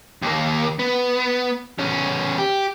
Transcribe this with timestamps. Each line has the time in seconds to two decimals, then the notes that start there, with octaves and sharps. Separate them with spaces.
0.22 D#2 A#3
0.79 B3
1.78 E2 C#4
2.38 G4